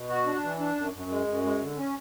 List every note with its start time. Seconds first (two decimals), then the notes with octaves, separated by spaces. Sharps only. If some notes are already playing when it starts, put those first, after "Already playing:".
Already playing: B2
0.09 F#4
0.26 D4
0.43 E3
0.59 D4
0.76 F#2
0.94 F#2
1.10 G#3
1.27 F#2
1.43 G#3
1.60 D3
1.77 C#4